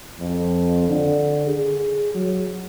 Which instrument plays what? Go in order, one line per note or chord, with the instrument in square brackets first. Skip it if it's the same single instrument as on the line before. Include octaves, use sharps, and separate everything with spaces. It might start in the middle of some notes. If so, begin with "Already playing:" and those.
[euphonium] F2
D3
G#4
F#3